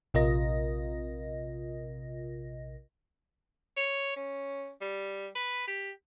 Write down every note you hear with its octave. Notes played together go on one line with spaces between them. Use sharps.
A#1 C3 F4 A#4 D#5 A#6
C#5
C#4
G3
B4
G4